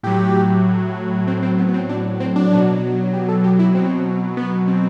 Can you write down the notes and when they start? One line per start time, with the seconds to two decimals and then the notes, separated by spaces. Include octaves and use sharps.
0.03 A2 F#3 G4
1.27 A2 F#3 C4
1.43 C4
1.58 B3
1.68 B3
1.74 C4
1.89 D4
2.20 C4
2.36 D4
2.51 B2 F#3
3.13 G4
3.29 A4
3.44 G4
3.59 E4
3.75 B2 F#3 C4
4.37 B3
4.68 C4